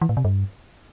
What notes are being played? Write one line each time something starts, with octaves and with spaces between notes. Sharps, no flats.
E3
A2
C3
G2